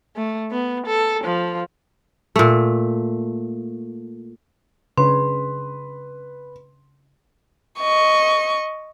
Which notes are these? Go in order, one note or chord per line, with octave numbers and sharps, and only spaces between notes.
A3
B3
A4
F3
A#2 A3
C#3 D4 B4 C#5 C6
D#5 C#6